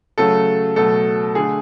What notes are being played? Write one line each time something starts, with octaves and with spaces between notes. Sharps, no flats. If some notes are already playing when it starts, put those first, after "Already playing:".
C#3 F#3 A3 A4
B2 F#3 A3 A4
D3 A3 G#4